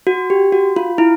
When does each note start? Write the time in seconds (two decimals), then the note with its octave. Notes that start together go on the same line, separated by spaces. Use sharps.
0.07 F#4
0.30 G4
0.52 F#4
0.76 F4
0.98 E4